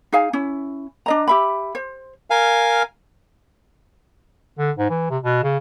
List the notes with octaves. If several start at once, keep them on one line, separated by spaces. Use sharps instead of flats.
D#4 G#4 F5 G#5
C#4 E4
D4 D#5 A#5
G4 E5 B5
C5
A#4 F5 G#5
D3
G#2
E3
C3
B2
C#3